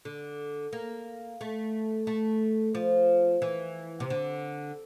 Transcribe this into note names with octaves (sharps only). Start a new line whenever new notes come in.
D3
A#3
A3
A3
F3
E3
C3
D3